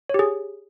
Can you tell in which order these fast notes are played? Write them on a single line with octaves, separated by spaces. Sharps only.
C#5 G4 G#4